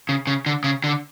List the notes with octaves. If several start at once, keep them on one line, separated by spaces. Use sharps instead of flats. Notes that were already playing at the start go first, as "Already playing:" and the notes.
C#3
C#3
D3
C#3
D3